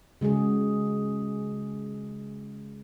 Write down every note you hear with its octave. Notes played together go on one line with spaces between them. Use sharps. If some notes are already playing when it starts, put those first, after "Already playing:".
C#3 G#3 F#4 G#4